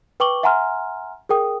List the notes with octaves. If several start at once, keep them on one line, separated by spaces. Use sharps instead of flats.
B4 G5 C#6 D6 F#7 G7
E5 F#5 G#5 A#5 C6 F6
G#4 A#4 G5 D#6